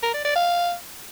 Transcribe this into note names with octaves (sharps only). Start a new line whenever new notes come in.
A#4
D5
D5
F5